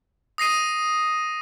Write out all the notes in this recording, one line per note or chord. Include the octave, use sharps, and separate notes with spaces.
D#6 A#6 C7 D#7